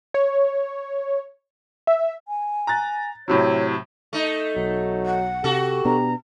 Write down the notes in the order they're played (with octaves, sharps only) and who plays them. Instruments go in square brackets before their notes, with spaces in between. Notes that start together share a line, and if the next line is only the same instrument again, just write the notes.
[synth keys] C#5
E5
[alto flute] G#5
[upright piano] A#5 F#6 A6
[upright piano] A2 C3 F#3 [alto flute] C#5
[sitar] A3 D#4
[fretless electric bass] B1 [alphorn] F#3
[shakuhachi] F#5
[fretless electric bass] C3 [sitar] F#4 A4 [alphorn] G4
[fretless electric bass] B2 B3 D4 [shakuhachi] A#5